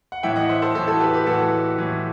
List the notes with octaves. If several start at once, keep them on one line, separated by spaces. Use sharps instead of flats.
F#5
A2 E3 E5 G5
D#5 F#5
C5 E5
A4 C5
A2 E3 A4 C5
F#4 A4
G4 B4
G4 B4
A2 E3 F#4 A4
A2 E3